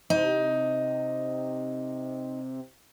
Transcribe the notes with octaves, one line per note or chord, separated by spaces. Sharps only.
C3 D#4